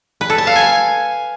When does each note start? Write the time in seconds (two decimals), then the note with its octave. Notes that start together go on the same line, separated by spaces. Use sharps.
0.21 B4
0.30 A4
0.38 A5
0.47 F5
0.56 G#5